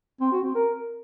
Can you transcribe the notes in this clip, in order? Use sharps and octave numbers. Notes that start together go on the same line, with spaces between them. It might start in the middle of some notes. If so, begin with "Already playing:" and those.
C4
F#4
C4
A#4